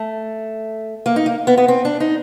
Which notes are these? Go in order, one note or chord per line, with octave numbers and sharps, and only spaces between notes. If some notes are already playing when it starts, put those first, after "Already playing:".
Already playing: A3
A#3
D#4
A#3
B3
B3
C4
D4
D#4